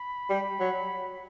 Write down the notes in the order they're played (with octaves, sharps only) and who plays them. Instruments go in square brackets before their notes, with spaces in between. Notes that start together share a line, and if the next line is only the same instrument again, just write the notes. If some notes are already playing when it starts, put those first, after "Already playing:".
Already playing: [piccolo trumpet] B5
[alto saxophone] G3
F#3